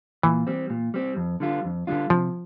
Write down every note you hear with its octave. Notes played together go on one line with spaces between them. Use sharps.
A#2 E3
G3 C4
A#2
G3 C4
F2
D3 G3 D4 F4
F2
D3 G3 D4 F4
C3 F3